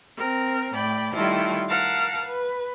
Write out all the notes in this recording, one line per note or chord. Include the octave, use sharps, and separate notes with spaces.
C4 A#4
A2 D5 G5 B5
D#3 G3 A3 E4 F4
A#4 F5 F#5 A5
B4